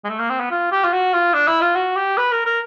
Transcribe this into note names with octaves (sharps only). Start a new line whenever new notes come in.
G#3
A3
A#3
C4
B3
F4
G4
F4
F#4
F4
D4
E4
F4
F#4
G4
B4
A#4
A#4